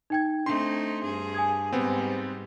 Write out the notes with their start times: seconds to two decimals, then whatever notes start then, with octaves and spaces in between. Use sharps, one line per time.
0.10 D#4 G5 G#6
0.46 A3 C4 D4 D#4 C6
1.04 G2 G#4
1.34 G#5 D#6 G#6
1.73 G#2 G3 B3 C4